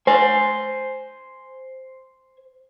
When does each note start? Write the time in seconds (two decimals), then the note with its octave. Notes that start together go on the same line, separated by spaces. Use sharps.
0.07 C5 G#5